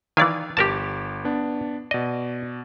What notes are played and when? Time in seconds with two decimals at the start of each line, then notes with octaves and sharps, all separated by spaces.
0.17 D#3 E3 D5 F5 G#5
0.57 G1 G4 A#4 A5 D6
1.25 B3 D4
1.91 B2 D5 D#5